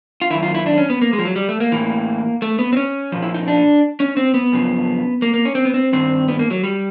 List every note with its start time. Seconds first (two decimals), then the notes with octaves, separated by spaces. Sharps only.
0.22 F4
0.30 F#2 D#3 E4
0.43 F4
0.55 E4
0.66 D4
0.77 C#4
0.90 B3
1.01 A#3
1.13 G#3
1.19 F3
1.25 F#3
1.36 G3
1.49 A3
1.60 A#3
1.72 A2 E3
2.42 A3
2.59 B3
2.73 C4
2.77 C#4
3.12 A#2 F3
3.22 E4
3.34 D#4
3.48 D4
4.00 C#4
4.17 C4
4.34 B3
4.52 F#2 C#3 F3
5.22 A#3
5.34 A#3
5.45 C#4
5.55 C4
5.65 B3
5.74 C4
5.93 G2 D#3 C4
6.28 B3
6.39 A#3
6.51 F#3
6.63 G3